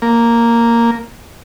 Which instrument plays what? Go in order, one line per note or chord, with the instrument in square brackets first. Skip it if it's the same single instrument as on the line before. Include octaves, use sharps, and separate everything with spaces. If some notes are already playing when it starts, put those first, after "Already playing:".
[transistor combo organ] A#3